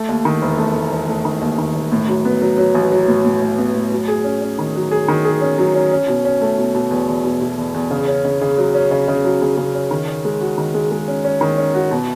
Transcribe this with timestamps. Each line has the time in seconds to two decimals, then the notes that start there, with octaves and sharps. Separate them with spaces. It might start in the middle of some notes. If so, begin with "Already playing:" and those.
Already playing: A3
0.09 D#2
0.25 D#3
0.42 E1
0.58 A3
0.75 A3
0.92 E1
1.08 A3
1.25 D#3
1.41 D#2
1.58 D#3
1.75 E1
1.92 A2
2.08 F#3
2.25 B3
2.42 F#3
2.58 F#3
2.75 A1
2.92 F#3
3.08 A2
3.25 A2
3.42 A2
3.58 B3
3.75 A2
3.92 F#3
4.08 G#4
4.24 C#4
4.41 C#4
4.59 D#3
4.75 F#3
4.91 G#4
5.08 D#3
5.25 G#4
5.41 C#4
5.58 F#3
5.75 C#4
5.91 C#4
6.08 B2
6.25 C#4
6.41 A3
6.58 B2
6.75 B2
6.91 E2
7.08 E2
7.25 B2
7.41 B2
7.58 E2
7.74 E2
7.91 C#3
8.08 C#4
8.25 C#3
8.41 C#3
8.58 F#3
8.75 C#4
8.91 C#3
9.08 C#3
9.24 F#3
9.42 C#3
9.57 C#3
9.74 C#4
9.91 D#3
10.08 C#4
10.25 G#3
10.41 F#4
10.58 D#3
10.74 G#3
10.91 G#3
11.08 C#4
11.25 C#4
11.41 D#3
11.58 C#4
11.74 F#4
11.91 B2